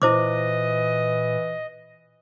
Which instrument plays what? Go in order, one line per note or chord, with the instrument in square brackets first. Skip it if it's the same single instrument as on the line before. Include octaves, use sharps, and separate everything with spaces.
[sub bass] A#2 [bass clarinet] E3 [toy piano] E4 C5 D6 [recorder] D#5